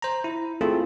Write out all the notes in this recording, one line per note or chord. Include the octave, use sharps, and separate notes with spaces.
C5 A#5
E4
A3 C4 E4 F4 G#4 A4